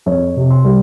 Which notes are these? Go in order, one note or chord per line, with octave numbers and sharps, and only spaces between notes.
F2 C#5
C3
C6
G3